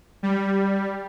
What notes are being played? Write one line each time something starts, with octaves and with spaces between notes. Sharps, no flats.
G3